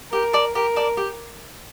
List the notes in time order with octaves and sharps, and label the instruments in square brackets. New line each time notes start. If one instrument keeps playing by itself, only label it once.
[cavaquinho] G4 [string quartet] A#4
[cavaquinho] D5 A5 D6
[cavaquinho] G4 [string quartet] A#4
[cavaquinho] D5 A5 D6
G4